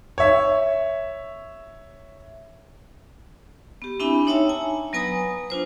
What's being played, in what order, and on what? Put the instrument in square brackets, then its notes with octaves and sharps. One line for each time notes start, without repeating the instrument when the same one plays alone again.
[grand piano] C#5 E5
[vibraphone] B3 G4
C4 D4 E4 E5 G#5 B5
D#4 C#5 E5 G5 A5 E6
G#5 A#5
F#3 B3 B4 G#5 A#5 D#6
D4 F4 C5